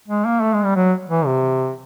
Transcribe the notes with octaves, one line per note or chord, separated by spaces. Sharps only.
G#3
A#3
A3
G#3
G3
F#3
E3
C3